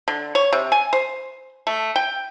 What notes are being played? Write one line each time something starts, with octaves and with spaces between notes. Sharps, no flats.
D3
C#5
C3
G#5
C5
A3
G5